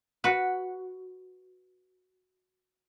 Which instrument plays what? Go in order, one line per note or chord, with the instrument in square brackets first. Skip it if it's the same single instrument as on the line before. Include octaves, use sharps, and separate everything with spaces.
[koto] F#4 B4